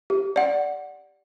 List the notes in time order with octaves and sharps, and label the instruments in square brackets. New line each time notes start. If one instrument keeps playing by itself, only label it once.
[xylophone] G4
D5 F#5